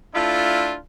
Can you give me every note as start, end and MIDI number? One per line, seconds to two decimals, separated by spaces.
0.14 0.75 57
0.14 0.75 62
0.14 0.75 64
0.14 0.75 65